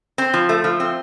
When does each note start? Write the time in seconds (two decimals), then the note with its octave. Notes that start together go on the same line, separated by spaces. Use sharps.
0.18 C4
0.34 F3
0.49 A3
0.64 F3
0.80 C4